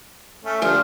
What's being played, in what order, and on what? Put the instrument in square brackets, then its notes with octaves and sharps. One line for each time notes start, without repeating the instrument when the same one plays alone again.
[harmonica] A3 C#4
[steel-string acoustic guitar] D2 G3 D4 [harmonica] F3